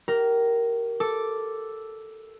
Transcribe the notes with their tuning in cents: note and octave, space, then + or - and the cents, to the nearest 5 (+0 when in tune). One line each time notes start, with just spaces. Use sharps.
G4 -30 A#4 +0
A4 +0 D6 +0